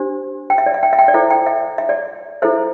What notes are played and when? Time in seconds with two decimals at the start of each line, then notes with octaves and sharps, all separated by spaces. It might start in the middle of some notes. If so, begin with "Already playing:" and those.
Already playing: D4 G4 C5
0.50 G5
0.58 E5
0.66 D5
0.74 E5
0.83 G5
0.93 E5
0.99 G5
1.08 D5
1.14 E4 A4 C5 E5
1.30 G5
1.46 E5
1.78 E5
1.89 D5
2.42 E4 A4 C5 E5